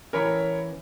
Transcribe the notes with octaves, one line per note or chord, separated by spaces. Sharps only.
E3 C#4 A#4 C#5 B5